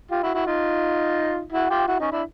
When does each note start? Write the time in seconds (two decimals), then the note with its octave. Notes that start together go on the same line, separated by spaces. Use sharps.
0.11 F4 G4
0.23 E4 F#4
0.34 E4 F#4
0.46 D#4 F4
1.52 E4 F#4
1.70 F4 G4
1.88 E4 F#4
2.00 C#4 D#4
2.12 D4 E4